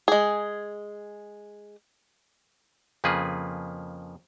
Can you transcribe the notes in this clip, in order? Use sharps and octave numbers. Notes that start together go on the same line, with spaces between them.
G#3 G#4
F2 C#3 F3 A#3 G#4 B4